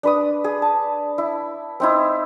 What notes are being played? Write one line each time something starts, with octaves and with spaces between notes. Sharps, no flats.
D4 B4 D#6
G#4
A5
E4
C4 D#4 E4